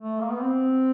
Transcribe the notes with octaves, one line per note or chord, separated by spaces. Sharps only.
A3
A#3
B3
C4